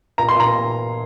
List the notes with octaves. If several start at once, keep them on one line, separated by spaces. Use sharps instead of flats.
A#2 A#5
C6
A#2 A#5